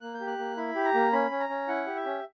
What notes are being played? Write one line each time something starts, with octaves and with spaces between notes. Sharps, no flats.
A#3 F#6
G6
G4
F#6
A#3
E4 B5
G4
A#5
A#3
C#4 B5
C#4
A#5
C#4
E4 F#5
G4
E5
C#4